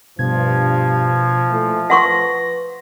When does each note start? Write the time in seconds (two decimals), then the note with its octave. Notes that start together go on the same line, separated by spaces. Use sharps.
0.19 G2 B2 F3 G#6
1.49 A#2 E3 A3
1.90 B4 F#5 C6 C#6 A#6